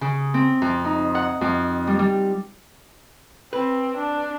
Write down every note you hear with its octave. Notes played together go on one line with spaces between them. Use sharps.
C#3
C4
F2
D#4
F#5
F2
G3
G3
C4 B4
D4